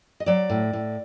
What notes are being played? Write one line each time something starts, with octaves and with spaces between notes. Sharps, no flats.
D#5
F#3 D5
A2
A2